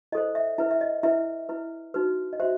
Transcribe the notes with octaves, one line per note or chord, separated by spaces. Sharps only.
E4 A4 C5 D#5
E5
E4 B4 E5
E5
D#5
E4 B4 E5
E4 B4
D#4 F#4 B4
D#5
F#4 C5 E5